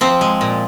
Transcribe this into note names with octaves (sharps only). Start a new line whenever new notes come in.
F3 C4
G#3
A#2